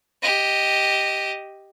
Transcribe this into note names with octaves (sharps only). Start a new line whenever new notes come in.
G4 D#5